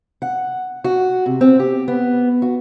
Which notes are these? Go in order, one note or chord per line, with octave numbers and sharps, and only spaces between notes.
F#5
F#4
C3
C4
G4
B3
F#4